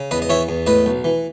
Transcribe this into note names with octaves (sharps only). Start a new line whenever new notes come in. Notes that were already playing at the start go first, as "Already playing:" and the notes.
Already playing: C#3
E2 B4 D#5
D#5
E3 C#5 E5
E2
A2 B4 D#5
B1
E3